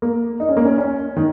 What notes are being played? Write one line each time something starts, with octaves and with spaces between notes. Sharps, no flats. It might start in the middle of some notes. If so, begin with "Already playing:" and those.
A#3
D#4
C#4
A#3
C#4
C#4
D#3